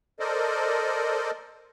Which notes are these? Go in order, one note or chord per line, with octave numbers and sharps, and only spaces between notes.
A4 A#4 C5 D5 D#5